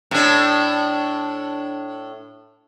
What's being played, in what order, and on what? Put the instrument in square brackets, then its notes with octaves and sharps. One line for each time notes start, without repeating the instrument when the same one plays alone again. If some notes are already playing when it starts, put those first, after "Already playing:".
[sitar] A2 D4